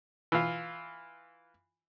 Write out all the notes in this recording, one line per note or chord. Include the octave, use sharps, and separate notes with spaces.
E3 F4